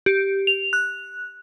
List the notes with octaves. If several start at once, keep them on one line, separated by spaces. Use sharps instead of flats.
G4
F7
F#6